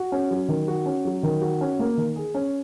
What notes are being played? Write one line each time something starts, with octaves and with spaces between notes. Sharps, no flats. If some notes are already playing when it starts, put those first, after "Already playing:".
Already playing: F#4
C#4
F#3
D#3
F#4
C#4
F#3
D#3
F#4
C#4
A#3
D#3
G#4
C#4